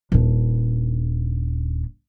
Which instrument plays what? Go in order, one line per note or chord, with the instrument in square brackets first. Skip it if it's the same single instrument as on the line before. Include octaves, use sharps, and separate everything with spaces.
[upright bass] D#1 D4